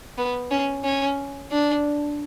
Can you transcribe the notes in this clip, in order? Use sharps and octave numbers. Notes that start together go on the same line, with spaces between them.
B3
C#4
C#4
D4